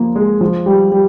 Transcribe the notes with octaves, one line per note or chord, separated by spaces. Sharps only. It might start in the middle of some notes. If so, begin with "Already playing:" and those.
Already playing: F3 A#3
G#3
F3
G3
G3